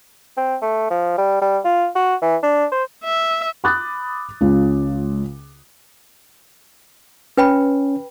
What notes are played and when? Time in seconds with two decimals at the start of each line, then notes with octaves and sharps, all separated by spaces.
0.37 C4
0.62 A3
0.90 F3
1.18 G3
1.41 G3
1.64 F4
1.95 F#4
2.22 E3
2.43 D4
2.71 C5
3.04 E5
3.64 B5 D6 D#6 F#6 A6
4.41 C#2 C#3 F4
7.38 C#4 B4 G5 B5